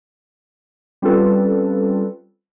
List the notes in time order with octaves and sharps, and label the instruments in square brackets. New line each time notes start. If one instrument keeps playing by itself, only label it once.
[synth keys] G3 C4 C#4 F4 A4 B4